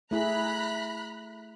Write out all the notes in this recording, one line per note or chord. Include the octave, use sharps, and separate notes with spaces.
A3 E4 G#4 A#5 B5 F#6